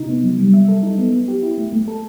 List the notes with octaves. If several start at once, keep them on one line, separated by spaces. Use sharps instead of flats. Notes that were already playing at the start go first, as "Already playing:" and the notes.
Already playing: C3 D#4
B3
F#3
G3
E5
A4
D#4
B3
B3
G4
E4
A3
A3
A4